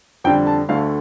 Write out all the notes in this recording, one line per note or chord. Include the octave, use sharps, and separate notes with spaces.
F2 D3 G3 G5
A5
D2 D3 A3 F5